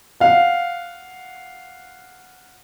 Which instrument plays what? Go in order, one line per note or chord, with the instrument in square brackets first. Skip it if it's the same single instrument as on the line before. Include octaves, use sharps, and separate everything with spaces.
[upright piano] F5 F#5